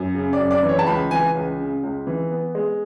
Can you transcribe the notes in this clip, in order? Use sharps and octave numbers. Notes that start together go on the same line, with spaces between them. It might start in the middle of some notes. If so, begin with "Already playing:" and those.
Already playing: F#2
C#3
D5
F#2
D5
E3
C#5
A5
C#2 B5
E3 G#5
C#2
C#3
C#2
E3
B3
G#3